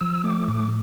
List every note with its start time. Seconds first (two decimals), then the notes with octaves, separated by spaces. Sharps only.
0.01 F3 E6
0.24 A3 D6
0.48 A2 D6